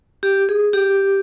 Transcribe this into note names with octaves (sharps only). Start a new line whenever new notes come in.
G4
G#4
G4